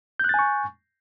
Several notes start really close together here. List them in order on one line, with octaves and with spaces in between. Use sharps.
G6 F#6 A6 G#5 C#6